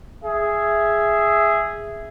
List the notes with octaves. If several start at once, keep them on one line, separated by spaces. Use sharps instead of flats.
G#4 E5